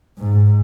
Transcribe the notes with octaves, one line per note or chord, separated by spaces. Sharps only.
G#2